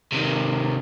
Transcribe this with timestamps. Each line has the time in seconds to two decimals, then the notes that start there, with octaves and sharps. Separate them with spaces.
0.12 C3 D#3